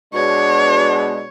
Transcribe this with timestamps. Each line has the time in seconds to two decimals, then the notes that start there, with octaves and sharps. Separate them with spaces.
0.14 B2 G#3 D4 C#5